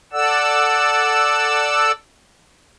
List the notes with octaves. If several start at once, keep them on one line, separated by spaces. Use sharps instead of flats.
A4 D5 F#5 E6